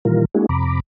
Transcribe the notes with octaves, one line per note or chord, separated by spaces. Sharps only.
A#2 D#3 E3 G3 F4 A#4
G#3 A#3 D4 E4 F#4 G#4
F2 C3 A#5 B5 D6